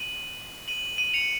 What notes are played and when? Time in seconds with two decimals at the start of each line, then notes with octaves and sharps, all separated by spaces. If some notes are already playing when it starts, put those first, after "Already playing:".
Already playing: D#7 F#7
0.68 D#7 F#7
0.98 D#7 F#7
1.14 C#7 F7